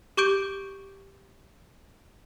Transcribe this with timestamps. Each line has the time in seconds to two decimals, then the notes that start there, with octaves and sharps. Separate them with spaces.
0.17 G4 C#6 D6 G6 D7